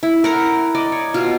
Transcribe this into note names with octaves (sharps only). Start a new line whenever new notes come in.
E4
A#4 F#5 A#5
D5 D#5
C#5
B2 F4